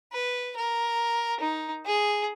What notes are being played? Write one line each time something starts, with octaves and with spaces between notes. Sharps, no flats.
B4
A#4
D#4
G#4